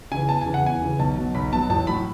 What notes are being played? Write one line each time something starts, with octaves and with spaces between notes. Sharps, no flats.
C#3 E3 G#5
E2 A5
C#3 E3 G#5
F#5
E2 G#5
C#3 E3
B1 A5
B2 F#3
B1 B5
B2 F#3 A5
A1 A5
A2 F#3 B5